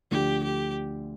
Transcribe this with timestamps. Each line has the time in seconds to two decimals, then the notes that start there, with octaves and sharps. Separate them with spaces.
0.11 D2 D3 F3 G4
0.43 G4